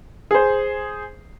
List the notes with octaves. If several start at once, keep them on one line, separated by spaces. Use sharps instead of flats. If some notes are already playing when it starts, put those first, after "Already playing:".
G#4 C5